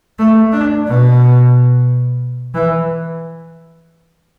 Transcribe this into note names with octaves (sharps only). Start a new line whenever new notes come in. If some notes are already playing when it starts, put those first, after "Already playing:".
A3
D4
B2
E3